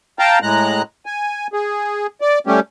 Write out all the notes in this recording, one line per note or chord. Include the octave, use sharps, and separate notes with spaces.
F5 G5 A5 A#5
A2 G#3 A#5 F#6
G#5
G#4
D5
G3 A3 C#4 G4